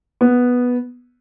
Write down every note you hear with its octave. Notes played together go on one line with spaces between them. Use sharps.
B3